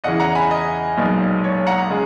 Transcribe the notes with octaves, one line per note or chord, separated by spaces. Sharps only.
E2 C#3 E3 D#5 F#5
F#5 A#5
G#5 B5
D#5
B1 A#2 G#3 B3 D#4
C#5
F#5 A#5
C#3 G#3